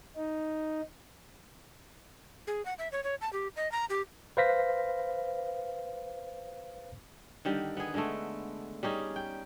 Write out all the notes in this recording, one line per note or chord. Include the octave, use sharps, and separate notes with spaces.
D#4
G#4
F#5
E5
C#5
C#5
A5
G4
D#5
A#5
G4
B4 C5 F5 A#6 B6
D3 D#3 G3
B3 G#4
D3 G#3 A3
G3 C#4 D#4 G#4
G5